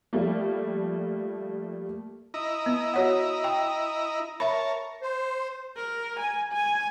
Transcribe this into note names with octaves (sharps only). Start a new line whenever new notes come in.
F3 G3 A3 A#3
E4 D#5 A#5
B3
F#4 C#5 F#5
G5
A#4 C#5 E5 A5 B5
C5
A#4
G#5
G#5